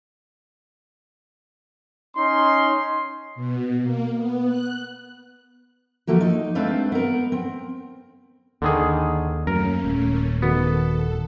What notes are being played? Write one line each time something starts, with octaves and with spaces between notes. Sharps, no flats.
C#4 D#4 C6
B2
A#3
B3
F#6
D2 F3 A3 A#3 F#4
D#4
G#3 A3 C4 D4 B4 F5
B3 A#4
C4
D#2 D3 D#3 G#4
F#2 A3 A#3 C#4 A#4
D#1
D#3 B3 F#4 A4